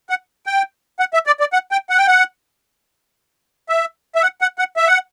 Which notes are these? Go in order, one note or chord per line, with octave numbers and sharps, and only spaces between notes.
F#5
G5
F#5
E5
D5
D5
F#5
G5
F#5
G5
F#5
E5
E5
F#5
F#5
F#5
E5
F#5